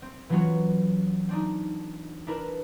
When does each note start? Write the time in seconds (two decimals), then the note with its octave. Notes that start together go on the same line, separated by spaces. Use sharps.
0.02 C4
0.29 E3 F#3 B3 C#4 F4 F#4
1.29 C4 D4 D#4
2.27 D4 E4 A#4 B4